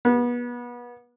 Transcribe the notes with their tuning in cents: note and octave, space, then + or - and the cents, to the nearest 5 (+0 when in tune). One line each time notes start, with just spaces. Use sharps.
B3 -30